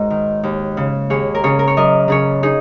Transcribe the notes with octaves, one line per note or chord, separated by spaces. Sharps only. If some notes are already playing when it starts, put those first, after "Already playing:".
Already playing: G#2 D#4 F#4 A#4 C#5 D#5
D#3
D#2
C#3
D#2 G#4 C#5
A#4
C#3 G#4 C#5
A#4
C#5
F#2 A#4 D#5
C#3 G#4 C#5
D#4 G#4